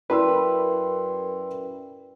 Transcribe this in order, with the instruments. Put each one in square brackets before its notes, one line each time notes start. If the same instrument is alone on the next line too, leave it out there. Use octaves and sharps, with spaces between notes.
[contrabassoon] F#2 [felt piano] E4 C6 E6 [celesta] A#4 D5 G5 [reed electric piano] B4